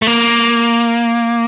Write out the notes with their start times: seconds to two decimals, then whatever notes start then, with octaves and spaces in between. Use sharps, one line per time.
0.02 A3
0.07 A#3